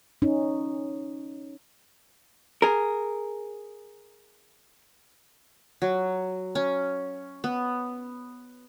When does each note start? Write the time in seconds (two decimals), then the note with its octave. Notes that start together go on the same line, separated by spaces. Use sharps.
0.22 C#4 D#4
2.62 G#4 A#4
5.82 F#3
6.55 C#4
7.44 B3